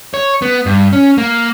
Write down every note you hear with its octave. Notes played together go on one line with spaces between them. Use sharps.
C#5
B3
G2
C#4
A#3